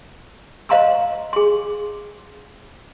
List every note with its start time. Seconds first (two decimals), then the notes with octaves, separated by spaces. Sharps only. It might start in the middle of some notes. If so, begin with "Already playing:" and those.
0.69 C5 D#5 F5 A#5 C6 E6
1.33 G#4 C6